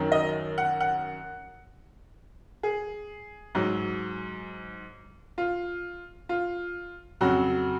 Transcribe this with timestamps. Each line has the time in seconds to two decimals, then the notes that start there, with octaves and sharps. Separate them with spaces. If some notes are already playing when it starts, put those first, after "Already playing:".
Already playing: F#2 D#3 F#3
0.12 D#5
0.58 F#5
0.80 F#5
2.63 G#4
3.55 G#2 F#3
5.38 F4
6.29 F4
7.21 F2 C#3 F#3 F#4